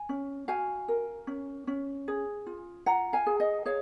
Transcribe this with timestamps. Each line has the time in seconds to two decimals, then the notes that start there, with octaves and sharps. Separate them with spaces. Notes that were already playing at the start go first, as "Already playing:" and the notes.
Already playing: G#5
0.09 C#4
0.48 F#4 F5 G#5
0.88 A#4
1.27 C#4
1.67 C#4
2.08 G#4
2.47 F4
2.86 F4 F#5 A#5
3.13 F5 G#5
3.26 G#4
3.40 D#5 F#5
3.65 G#4 C#5 F5